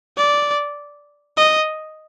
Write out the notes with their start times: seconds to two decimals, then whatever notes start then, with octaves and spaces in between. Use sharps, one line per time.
0.17 D5
1.37 D#5